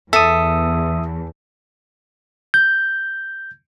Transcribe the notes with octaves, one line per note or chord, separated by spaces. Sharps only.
E2 A4 E5 D#6
G6